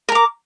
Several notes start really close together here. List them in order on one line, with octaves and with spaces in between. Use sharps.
A#4 A#5 D6